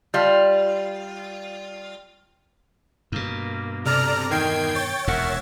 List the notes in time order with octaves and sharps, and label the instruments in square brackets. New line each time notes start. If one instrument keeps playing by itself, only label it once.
[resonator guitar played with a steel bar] G3 F4
[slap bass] G2 B2 [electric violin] A#3
[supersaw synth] C3 D5 A#5 [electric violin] A4 F6
[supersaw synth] E2 G#6 C7 [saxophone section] D#3 [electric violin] G5
[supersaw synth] C#5 A6
[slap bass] E1 D#2 A#2 [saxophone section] A#4 F#5 [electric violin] E5